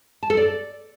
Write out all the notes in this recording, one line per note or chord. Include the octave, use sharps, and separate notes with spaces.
A5
A4
D5